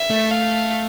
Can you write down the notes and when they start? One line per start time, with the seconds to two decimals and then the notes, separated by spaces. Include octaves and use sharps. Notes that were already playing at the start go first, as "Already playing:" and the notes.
Already playing: E5
0.10 A3
0.31 F5